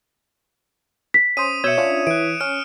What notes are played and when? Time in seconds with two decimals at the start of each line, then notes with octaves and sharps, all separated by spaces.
1.14 B6
1.37 C#4 C5 D#6 D#7
1.64 B2 C#5 E5 E6 G6 C#7 E7
1.77 C#4 D4 F4
2.07 E3 F#6 D7
2.41 C#4 F6